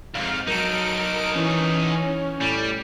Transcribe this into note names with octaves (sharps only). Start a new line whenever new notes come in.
C2 F2 G#2 F5
F#3 D#4 A4 A#4 D7
E3 C#4
A2 G3